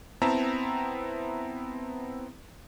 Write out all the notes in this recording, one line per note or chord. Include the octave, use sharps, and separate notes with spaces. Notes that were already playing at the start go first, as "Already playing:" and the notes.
B3 C4 E4 E5 A5 A#5